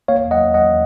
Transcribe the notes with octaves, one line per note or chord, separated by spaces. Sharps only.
A#3 C#5 F5
F#3 D#5 F#5
F#3 D#5 F#5